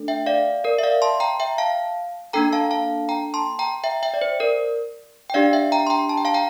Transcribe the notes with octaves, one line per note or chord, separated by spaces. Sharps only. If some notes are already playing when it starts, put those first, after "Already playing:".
Already playing: A3 D4 A4
E5 G5
D5 F5
A#4 D5
E5
D5 F5
A5 C6
G5 A#5
E5 G5
F5 A5
A#3 D4 A4 G5 A#5
F5 A5
F5 A5
G5 A#5
A5 C6
G5 A#5
E5 G5
E5 G5
D5
C5
A#4 D5
G5
D4 G4 D5 F5
E5 G5
G5 A#5
C6
G5 A#5
A5
G5
F5 A5
G5 A#5